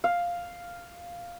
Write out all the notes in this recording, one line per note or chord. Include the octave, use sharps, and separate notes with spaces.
F5